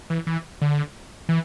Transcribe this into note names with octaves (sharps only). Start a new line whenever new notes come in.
E3
E3
D3
E3